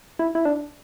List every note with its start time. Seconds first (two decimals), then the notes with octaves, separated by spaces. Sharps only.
0.19 E4
0.35 E4
0.45 D4